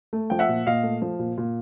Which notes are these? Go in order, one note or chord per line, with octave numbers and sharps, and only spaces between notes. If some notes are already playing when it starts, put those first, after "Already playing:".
A3
F3 G5
E5 F#5
A#2
A#2 D#5 F5
A3
F3
A#2
A#2